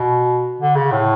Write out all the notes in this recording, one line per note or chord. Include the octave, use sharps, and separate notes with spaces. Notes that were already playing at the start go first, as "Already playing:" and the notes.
Already playing: B2
D3
C#3
A2